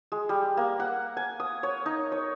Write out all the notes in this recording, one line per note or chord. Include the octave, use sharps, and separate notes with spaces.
G#3
G3
A#3
F#5
G#5
D#6
C#5
D#4
C#5